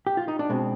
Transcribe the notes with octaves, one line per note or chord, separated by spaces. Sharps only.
G4
F4
D#4
D4
B2 G#3 C4